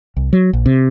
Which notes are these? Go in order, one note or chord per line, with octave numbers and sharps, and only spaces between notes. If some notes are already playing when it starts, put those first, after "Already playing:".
C2
F#3
A#1
C3